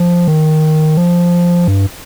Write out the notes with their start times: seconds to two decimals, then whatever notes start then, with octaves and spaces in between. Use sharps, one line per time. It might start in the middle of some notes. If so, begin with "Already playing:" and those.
Already playing: F3
0.28 D#3
0.97 F3
1.68 G2